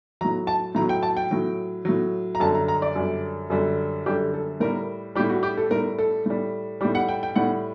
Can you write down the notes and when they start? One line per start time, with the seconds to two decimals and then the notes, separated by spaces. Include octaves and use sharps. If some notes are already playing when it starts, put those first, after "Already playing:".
0.21 A2 F#3 A#5
0.47 A5
0.75 A2 F#3 A#5
0.89 G5
1.03 A5
1.17 G5
1.31 A2 F#3
1.85 A2 F#3
2.35 A#5
2.40 F#2 D3 G3 A5
2.55 A#5
2.68 A#5
2.82 D5
2.96 F#2 D3 G3
3.50 F#2 D3 G3
4.06 F#2 D3 G3 G4
4.34 A4
4.60 A2 G3 A#4
5.15 G3 G4
5.20 A2
5.30 F#4
5.43 G4
5.57 A4
5.71 A2 G3 A#4
5.98 A4
6.26 A2 G3
6.81 G3 G4
6.85 A2
6.95 F#5
7.08 G5
7.23 G5
7.35 A2 G3 F#5